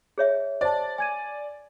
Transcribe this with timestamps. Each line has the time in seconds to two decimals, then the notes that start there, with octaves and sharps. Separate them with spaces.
0.18 G#4 C#5 E5
0.61 C5 D5 A5
0.98 G#5 G#6 D#7